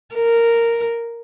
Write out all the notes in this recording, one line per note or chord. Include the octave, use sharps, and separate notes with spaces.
A#4